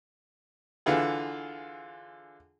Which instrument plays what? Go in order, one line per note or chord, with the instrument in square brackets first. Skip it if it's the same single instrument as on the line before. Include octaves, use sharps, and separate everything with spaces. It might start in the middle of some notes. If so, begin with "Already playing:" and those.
[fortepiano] D3 E3 F4 G#4